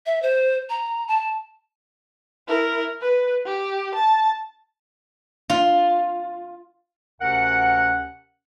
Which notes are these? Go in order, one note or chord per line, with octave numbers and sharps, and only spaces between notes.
E5
C5
A#5
A5
E4 A#4
B4
G4
A5
F4
D2 C3 C#4 A#4 F#5